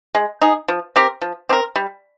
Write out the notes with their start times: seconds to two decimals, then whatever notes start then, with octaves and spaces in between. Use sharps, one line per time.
0.15 G#3
0.41 D#4 G#4
0.68 F3
0.96 C4 G4 A#4
1.21 F3
1.49 C4 G4
1.53 A#4
1.76 G3